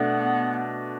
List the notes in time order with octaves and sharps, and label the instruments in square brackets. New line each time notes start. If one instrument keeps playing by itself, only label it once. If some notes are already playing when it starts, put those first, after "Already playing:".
Already playing: [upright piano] B2 A3 D4 [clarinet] B3